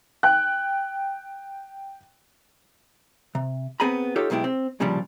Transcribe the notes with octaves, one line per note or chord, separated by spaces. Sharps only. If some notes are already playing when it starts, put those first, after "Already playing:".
G5 F#6
C3
B3 C4 G#4 G#5 A#5 B5
D#4 F4 G4 A4 C#5
B1 B2 G#3 E4 G4
C4
C2 A#2 C#3 F3 G3 D4